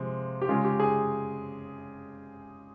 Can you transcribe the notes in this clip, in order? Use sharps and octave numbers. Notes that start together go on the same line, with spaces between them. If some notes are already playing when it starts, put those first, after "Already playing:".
Already playing: C3 F3 G#3
G4
C#3 G#3 F4
G4
G#4